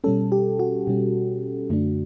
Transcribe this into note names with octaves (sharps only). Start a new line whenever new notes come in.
B2 G3 C#4 A4
G4
F#4
B2 G3 C#4
F#2 D3 A3 D4